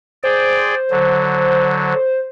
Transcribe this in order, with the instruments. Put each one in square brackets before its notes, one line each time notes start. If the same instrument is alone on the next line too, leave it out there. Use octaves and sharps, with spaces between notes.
[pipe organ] G#4 D5 G5 [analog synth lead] C5
[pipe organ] D3 F#3